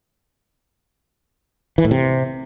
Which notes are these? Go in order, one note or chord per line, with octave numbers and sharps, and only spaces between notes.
E3
A2
C3